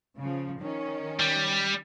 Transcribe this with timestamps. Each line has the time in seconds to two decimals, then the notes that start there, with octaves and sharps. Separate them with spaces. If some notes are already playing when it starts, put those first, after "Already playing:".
0.18 C#3 F3
0.59 D#3 C#4
1.20 G3